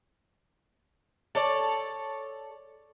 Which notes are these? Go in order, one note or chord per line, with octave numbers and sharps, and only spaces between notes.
A4 C#5 D5